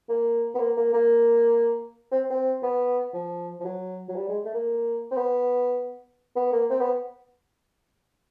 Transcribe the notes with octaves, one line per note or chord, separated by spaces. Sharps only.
A#3
B3
A#3
A#3
A#3
C4
C4
B3
F3
F3
F#3
F#3
G3
G#3
A3
A#3
C4
B3
B3
A#3
C4
B3